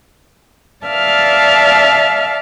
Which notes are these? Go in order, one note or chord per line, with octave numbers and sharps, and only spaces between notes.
D5 E5 F5 A5 F6